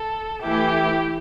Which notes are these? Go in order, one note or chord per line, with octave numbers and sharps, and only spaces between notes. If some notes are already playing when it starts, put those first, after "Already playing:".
Already playing: A4
E3 A3 E4 G4